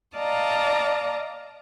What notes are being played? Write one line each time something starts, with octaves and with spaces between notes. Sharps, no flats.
D5 D#5 F5 A5 A#5